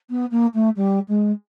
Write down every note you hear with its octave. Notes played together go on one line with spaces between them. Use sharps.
B3
A#3
A3
G3
G#3